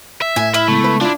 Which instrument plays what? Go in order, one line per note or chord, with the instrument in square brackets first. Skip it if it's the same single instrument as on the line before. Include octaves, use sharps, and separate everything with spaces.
[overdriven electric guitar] E5
[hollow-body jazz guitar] A2 [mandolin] G#5
[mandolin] E4 [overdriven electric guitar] E5 [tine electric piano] F6
[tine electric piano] C#3 G#3 B3 [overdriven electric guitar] A3
[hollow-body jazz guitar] B4
[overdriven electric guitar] D4 [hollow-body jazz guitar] E4 F4